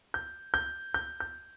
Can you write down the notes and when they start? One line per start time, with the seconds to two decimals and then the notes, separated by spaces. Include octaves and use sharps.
0.14 G6
0.54 G6
0.94 G6
1.20 G6